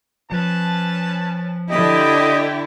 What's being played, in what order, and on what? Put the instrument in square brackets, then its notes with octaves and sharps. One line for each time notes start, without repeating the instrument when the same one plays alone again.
[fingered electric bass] F3 [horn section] C#4 B4 A5
[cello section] D3 E4 [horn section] G4 [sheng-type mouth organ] D#5